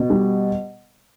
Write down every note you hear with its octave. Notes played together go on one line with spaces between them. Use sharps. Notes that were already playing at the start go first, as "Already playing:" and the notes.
Already playing: B2
G3